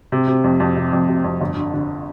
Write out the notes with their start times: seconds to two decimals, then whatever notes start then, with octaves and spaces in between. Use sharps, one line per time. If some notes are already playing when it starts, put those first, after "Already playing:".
0.12 C3
0.27 C3
0.44 F2
0.60 F2
0.77 C3
0.93 F2
1.08 C3
1.24 F2
1.41 G1
1.57 D3
1.74 D3